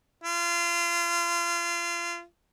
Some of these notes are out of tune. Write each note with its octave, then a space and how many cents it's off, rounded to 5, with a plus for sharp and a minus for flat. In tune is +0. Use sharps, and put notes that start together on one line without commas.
F4 -30